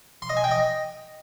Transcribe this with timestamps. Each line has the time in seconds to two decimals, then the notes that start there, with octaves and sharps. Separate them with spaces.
0.22 C6
0.29 D#5
0.37 G#5
0.44 G5
0.51 D#5